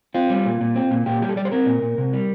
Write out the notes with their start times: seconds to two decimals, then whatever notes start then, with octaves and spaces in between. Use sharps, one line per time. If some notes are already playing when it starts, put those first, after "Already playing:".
0.14 C4 F4
0.30 G3
0.46 A#2
0.61 A#2
0.75 C4
0.91 A#2
1.06 A#2 G4
1.22 G3 G4
1.29 A4
1.36 G3 D5
1.45 C5
1.52 C4 A#4
1.66 A#2
1.82 A#2
1.98 C3
2.13 G3